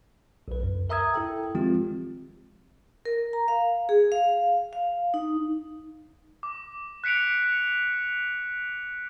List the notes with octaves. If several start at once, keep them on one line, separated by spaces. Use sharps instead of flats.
B1 B4
C#2 F#2
A#4 E5 A#5 D#6 E6 G#6
E4 A4 G5
D#3 F3 G#3 C4 F4 G4
A#4
A#5
F5
G#4
F5
F5
D#4
D6
F#6 B6 C#7 D7 F7
C#7